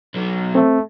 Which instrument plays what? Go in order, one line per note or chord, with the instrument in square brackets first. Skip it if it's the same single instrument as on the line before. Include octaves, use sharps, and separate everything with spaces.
[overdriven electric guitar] B1 F#3
[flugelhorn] A3 [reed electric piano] C4